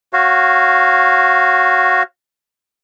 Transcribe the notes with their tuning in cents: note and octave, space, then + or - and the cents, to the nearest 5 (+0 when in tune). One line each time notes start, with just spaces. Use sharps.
F#4 +0 C#5 -25 F5 +0